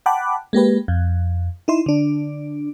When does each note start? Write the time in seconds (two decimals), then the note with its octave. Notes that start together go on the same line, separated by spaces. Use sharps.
0.06 F#5 G5 A5 B5 D6 F#6
0.53 G#3 A#3 G4 B4
0.88 F2
1.68 D#4 E4 C6
1.86 D3 D4